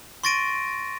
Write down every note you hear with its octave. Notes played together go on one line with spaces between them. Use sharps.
C6 C#6 A6 A#6 D7 D#7